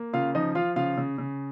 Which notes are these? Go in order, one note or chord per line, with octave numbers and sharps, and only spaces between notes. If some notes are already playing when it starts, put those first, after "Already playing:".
Already playing: A#3
C#3 F4 F5
F3 D#4 D#5
F3 F4 F5
C#3 F4 F5
C#3
C#3